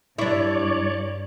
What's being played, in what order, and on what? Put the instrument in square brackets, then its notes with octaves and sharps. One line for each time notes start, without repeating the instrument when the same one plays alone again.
[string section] G2 [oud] D4 E4 [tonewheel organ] C#5 D5